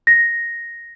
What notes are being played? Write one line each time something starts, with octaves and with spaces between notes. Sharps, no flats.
A#6